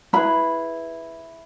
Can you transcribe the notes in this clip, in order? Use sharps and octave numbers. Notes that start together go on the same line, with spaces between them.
C#4 E4 G#4 B4 B5